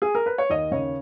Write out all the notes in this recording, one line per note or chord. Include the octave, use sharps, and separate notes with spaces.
G#4
A#4
B4
C#5
D#2 D#5
C#3 C#5